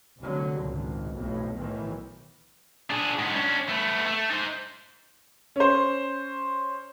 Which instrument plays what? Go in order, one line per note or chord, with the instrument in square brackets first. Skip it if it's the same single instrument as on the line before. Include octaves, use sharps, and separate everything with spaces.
[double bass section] F1 D3 F#3
G#1 C#2 A#2
B1 F2 A2
B1 A2 D#3 E3
[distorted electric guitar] D4 G#4
G#2 B3
C#4 D4
A3 B3
A3
D#4 C5
[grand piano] C#4 C5